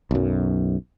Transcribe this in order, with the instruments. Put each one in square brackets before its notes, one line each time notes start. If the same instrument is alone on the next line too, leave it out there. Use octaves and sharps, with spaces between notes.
[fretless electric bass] B1 F#2